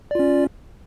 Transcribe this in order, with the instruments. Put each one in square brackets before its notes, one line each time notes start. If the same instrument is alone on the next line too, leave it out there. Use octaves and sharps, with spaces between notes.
[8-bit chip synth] D5
F4
C#4